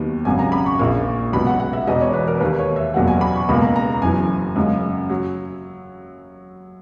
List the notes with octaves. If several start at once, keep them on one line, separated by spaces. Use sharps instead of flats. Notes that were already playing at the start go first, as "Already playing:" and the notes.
Already playing: D#2 D#3 F#3 B3
G#1 F#2 C#3 G#5
A#5
B5
C#6
A#1 A#2 A#3
C#2 B2 F#3 B5
F#5
F#5
E5
E1 E2 B2 D#5
C#5
B4
A#4
D#2 D#3 A#3 B4
C#5
E5
F#1 E2 B2 F#3 A#3 F#5
G#5
B5
C#6
C#2 B2 A#3 B5
A#5
A#5
F#1 F#2 E3 G#5
F#2 C#3 G#3
F#3